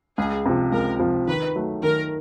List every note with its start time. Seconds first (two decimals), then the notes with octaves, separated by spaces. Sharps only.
0.17 C#2 G#4
0.46 C3 F3
0.72 C#2 A#4
1.00 C3 F3
1.28 D#3 B4
1.56 F#3 A3
1.83 D#3 A#4